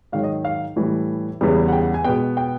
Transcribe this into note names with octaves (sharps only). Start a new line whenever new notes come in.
G#2 D#3 F#3 F5
D#5
F5
A2 E3 G3
E2 C#3 E3 G3 B3
F#5
G5
F#5
G#5
B2 G#3 B3 G5
G5